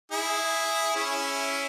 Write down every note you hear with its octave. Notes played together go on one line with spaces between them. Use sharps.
E4 G#4
C#4 E4